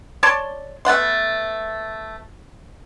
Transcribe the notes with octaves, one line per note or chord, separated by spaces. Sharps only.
C#5 D5 A5 C6
A3 B3 F#5 C6